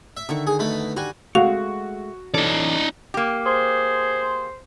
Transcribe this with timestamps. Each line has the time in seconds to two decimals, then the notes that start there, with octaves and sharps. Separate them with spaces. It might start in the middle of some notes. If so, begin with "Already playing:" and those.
0.17 E5
0.29 D3 D#3 C#6
0.47 G#4
0.59 B2 A3 B5
0.97 G3 F#4 G#5
1.35 G#3 A3 F#4 F5
2.34 E3 C#4 D#4 A4 D5
3.14 A#3 G4
3.46 G#4 C5